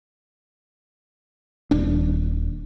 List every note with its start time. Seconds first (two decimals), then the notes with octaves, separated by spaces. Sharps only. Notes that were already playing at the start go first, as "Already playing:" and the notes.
1.71 D#1 D4